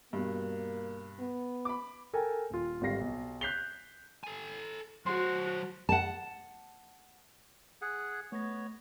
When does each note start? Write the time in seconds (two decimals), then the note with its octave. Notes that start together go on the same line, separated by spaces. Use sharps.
0.13 G2 B2 A#3
1.19 B3
1.65 B5 D6
2.13 A4 A#4 G5 G#5
2.50 D#1 F4
2.81 G#1 D3 G3 F5 A#6 C7
3.00 B1
3.41 F#6 G6 B6 C7 F7 G7
4.24 A4 G#5
5.06 F#3 F#4 C5 C6
5.89 F#5 A5
7.82 G#4 F#5
8.32 A3 B3 C#5 A#6